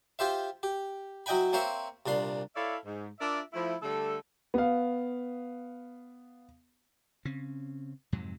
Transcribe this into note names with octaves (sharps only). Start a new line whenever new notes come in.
F4 G4 C5 E5
G4
F#3 E4 D#5 G5 G#5 B5
A#3 C4 C5 C#5 E5
C2 A#2 D4 C6
E4 A4 C#5 D5 E5 F5
G#2
D4 F4 A#4 D5 E5
F3 A3 E4
D3 G3 A3 A4
B3 F5
C#3 C4 C#4
F2 G#2 C3 F#3